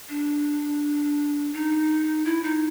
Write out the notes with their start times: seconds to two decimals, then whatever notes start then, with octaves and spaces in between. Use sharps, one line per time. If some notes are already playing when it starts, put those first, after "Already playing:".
0.09 D4
1.53 D#4
2.25 E4
2.43 D#4